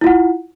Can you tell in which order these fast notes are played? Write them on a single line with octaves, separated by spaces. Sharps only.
E4 F4 F#5